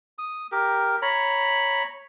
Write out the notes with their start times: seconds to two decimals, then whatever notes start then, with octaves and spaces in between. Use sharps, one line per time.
0.18 D#6
0.52 G4 A#4
1.02 C#5 A#5 B5